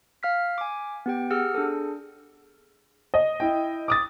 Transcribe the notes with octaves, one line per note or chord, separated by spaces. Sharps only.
F5 F6 B6
G#5 D6
B3 G4 G5
G4 G#4 F#5 E6 F6
D4 G#4 A4
D#5
E4 G5
D6 D#6 A6